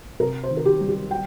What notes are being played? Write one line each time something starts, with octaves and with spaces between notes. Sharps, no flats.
C3 A#4
C5
D#3
A#4
G4
G3
G4
G5